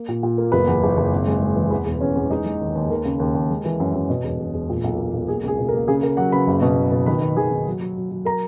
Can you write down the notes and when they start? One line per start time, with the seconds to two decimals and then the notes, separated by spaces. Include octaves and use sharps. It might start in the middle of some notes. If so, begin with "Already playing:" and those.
Already playing: A#3
0.08 A#2
0.23 A#2
0.38 A#3
0.52 F#1 B3 B4
0.67 E2
0.83 F#1
0.97 F#1
1.12 G#1
1.27 G#3
1.42 G#3
1.56 E3
1.71 E2 B3 B4
1.86 E1
2.01 E2 C#4 C#5
2.15 E2
2.30 G#3 D#4 D#5
2.46 G#3
2.61 D#2
2.75 D#2
2.90 D#2 A#4
3.05 C#3
3.20 D#2
3.35 D#2
3.50 G#3
3.65 E3
3.80 F#2
3.94 F#2
4.09 B2
4.24 E1
4.39 E1
4.54 E1
4.69 A#2
4.84 B1
4.99 A#3
5.14 B1
5.28 A#3 G#4
5.43 C#2 G#4
5.58 B2
5.69 A#4
5.73 A#3
5.88 C#3 G#4
6.03 C#3 A#4
6.17 F#3 F#4 F#5
6.32 C#3 B4 B5
6.47 F#1
6.62 B2
6.77 F#1
6.92 B2
7.06 D#3 B4 B5
7.21 D#3
7.37 D#3 G#4 G#5
7.52 D#3
7.67 F#3
7.81 F#3
7.96 F#3
8.11 F#3
8.25 A#4 A#5